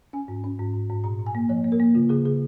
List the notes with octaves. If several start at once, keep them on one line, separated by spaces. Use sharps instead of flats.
C#4 G#5
G#2
C#4
G#2
G#2
G#2
A#2 A#5
A#2
G#5
A#3
F3 C#5
A#3
A#4
A#3
C#3 F4
C#3 G#4
C#3 G#4